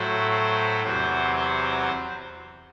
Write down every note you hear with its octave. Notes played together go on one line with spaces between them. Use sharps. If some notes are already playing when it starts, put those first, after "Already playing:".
Already playing: A2 F#3 A3 C5
C5
E2 C3 F#3 C4 C5
C5